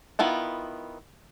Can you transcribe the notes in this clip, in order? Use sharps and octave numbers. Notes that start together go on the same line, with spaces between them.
D#3 B3 E4 F4